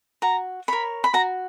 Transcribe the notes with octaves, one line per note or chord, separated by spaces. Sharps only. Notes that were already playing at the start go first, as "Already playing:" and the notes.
F#4 A#5
A#4 C#5 B5
B5
F#4 A#5